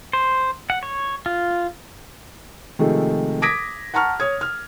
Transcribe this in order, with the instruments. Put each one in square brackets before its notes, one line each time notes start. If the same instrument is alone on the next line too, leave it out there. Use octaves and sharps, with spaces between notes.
[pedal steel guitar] C5
F#5
C#5
F4
[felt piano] C3 D#3 F3 G#3 A3
D6 D#6 G#6 A#6 B6 D7
F#5 A5 A#5 C#6 F6
C#5 D#6 G#6
F6